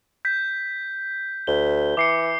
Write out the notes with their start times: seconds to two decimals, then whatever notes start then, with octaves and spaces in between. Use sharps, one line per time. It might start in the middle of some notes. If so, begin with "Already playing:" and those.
0.25 G6 B6
1.47 D2 G7
1.97 E3 D6 C7 C#7